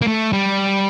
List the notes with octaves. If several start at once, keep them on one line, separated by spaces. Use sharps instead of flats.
A#3
A3
G3